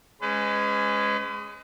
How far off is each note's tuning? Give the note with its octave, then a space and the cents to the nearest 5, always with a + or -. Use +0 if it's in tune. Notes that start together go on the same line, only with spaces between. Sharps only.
G#3 +0 C#4 +0 B4 +40